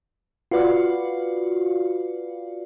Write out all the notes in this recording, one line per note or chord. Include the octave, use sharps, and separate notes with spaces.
F4 F#4 B4 D5 F5